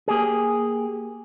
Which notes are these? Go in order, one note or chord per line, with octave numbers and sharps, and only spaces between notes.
A#3 G4 G#4